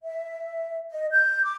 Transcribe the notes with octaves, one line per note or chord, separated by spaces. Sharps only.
E5
D#5
G6
D6